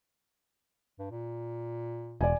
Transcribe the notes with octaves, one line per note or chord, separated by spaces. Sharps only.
G2
A#2
E1 D5 G#5